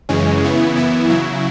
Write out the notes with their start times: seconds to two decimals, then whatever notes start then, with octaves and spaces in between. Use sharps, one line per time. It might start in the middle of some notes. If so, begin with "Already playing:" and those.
0.09 F#2 C#3 E3 G#3 C#4
0.42 C#3 E3 B3 E4
0.75 F#2 E3 B3 E4
1.09 C#3 F#3 E4